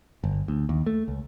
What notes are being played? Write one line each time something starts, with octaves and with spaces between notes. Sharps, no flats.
G1
D2
D#2
A3
C#2